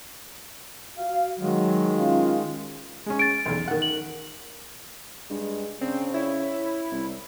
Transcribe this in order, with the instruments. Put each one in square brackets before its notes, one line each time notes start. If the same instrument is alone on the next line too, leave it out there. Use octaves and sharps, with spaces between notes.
[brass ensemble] F#4 F5
[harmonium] D#3 G#3 [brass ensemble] F#3
[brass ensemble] C#4 F4 F5
[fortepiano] G#3 C#4
[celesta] A6 D7
[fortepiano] B1 E2
D#3 F#5
[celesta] F#7
[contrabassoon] G2 [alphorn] G#3
[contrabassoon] C#3 [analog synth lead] C4 [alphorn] D4
[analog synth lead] E4 [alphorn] C#5
[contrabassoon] C2